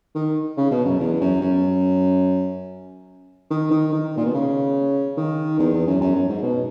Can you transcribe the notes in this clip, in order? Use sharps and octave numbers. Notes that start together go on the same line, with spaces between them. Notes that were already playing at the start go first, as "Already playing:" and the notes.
D#3
C#3
B2
F#2
E2
F#2
F#2
D#3
D#3
D#3
A#2
B2
C#3
D#3
E2
E2
F#2
F#2
F#2
G#2
B2